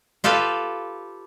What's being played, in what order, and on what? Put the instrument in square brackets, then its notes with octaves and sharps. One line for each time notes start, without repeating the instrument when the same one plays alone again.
[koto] F4 G4 A4 B4 F5